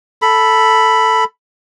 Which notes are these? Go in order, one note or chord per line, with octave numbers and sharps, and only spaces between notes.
A4 B5